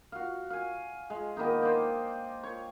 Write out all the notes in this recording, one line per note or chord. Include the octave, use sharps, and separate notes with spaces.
F#4 F5
F5 G#5
G#3
D#3 A#3 B3 D#4
C5 D5 D#5 G5
C#5